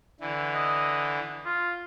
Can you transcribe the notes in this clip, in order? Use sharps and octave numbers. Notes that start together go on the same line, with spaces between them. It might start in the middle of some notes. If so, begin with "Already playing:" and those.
D3 E3
D#5
F4